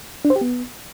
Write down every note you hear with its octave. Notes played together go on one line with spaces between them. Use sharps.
D4
C5
G4
B3